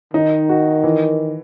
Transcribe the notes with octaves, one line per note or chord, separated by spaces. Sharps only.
D#3 D#4
F#4
E3